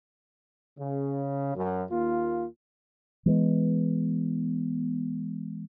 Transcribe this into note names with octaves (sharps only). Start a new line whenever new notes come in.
C#3
F#2
D#2 A#3 F4
E3 G#3 B3